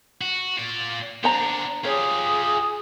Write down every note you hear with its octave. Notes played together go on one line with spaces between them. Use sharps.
F#4
F4 D5
B3 D4 C5 A#5
F4 G4 G#4 C#5